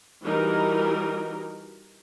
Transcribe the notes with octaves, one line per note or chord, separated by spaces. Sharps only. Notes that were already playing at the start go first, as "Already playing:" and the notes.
E3 G3 D#4 F#4 A#4